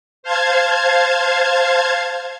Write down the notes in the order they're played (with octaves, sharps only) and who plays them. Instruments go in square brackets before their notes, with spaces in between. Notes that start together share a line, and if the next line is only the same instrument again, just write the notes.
[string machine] C5 F5 A5 G#6